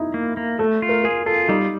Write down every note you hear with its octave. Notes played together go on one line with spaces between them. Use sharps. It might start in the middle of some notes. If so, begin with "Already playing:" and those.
Already playing: D#4 E4
A#3
A#3
A3 A4
F4
A#4
G#4 A#4
F4 A4
G3 D#4